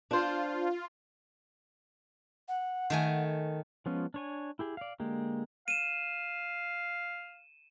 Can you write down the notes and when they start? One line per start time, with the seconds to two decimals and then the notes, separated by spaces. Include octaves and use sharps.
0.11 D4 F4 C5
2.48 F#5
2.90 D#3 A3 G#5
3.86 F3 G#3 B3 C#4 F4
4.14 D4 C#5 G#5
4.59 E4 G4 G#4
4.77 D5 F5
5.00 D3 G#3 A#3 G4
5.68 F5 D#7 E7